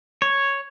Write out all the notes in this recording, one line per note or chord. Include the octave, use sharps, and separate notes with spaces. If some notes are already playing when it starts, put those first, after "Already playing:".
C#5